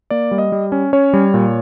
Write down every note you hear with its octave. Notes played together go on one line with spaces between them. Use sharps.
A#3 D5
G3
D#5
G3
C#4
C#4 C#5
G3
A#2